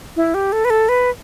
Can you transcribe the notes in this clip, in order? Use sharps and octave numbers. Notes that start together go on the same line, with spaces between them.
E4
G4
A4
B4
A4
B4